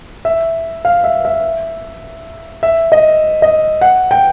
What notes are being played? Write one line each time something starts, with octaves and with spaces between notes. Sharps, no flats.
E5
F5
E5
E5
E5
D#5
D#5
F#5
G5